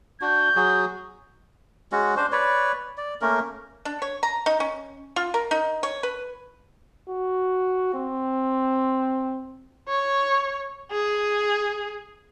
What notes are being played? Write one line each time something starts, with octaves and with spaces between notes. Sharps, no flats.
D4 F#4 G6
F#3 F#4 G#4
G#3 C#4 F#4
D4 C5
B4 C#5 D5
D5
A3 A#3 C#4 A#4
D4
C#5
A#5
D#4
C#4
F4
A#4
D#4
C#5
B4
F#4
C4
C#5
G#4